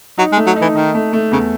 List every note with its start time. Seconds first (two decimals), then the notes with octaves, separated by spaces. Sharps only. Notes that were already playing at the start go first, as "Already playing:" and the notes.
0.18 F#3 D#4
0.32 G#3
0.37 A3
0.46 F#3
0.56 D#4
0.61 E3
0.75 D#3 D#4
0.95 A3
1.13 A3
1.31 E2 C#3